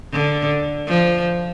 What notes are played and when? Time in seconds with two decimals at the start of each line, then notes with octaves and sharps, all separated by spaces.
0.13 D3
0.88 F3